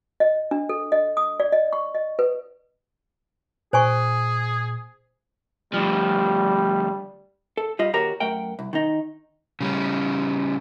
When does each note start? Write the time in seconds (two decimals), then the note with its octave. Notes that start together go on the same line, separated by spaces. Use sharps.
0.20 D#5
0.51 D4
0.69 A4
0.92 D#5
1.17 D#6
1.40 D5
1.52 D#5
1.73 C#6
1.95 D#5
2.19 B4
3.73 A#2 G#4 C5 G#5 C#6
5.73 D2 F3 G3
7.57 A4
7.79 G3 F4 D#5
7.93 D#2 F#4 G4 A#4 C#5 A#5
8.20 F#2 A3 A#4 F#5 G5
8.59 C2
8.73 D#3 D#4
9.60 C#3 G3 C#4